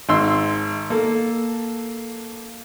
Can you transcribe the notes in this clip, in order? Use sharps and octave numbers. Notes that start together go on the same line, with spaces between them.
G#1 C6 E6
A#3 A4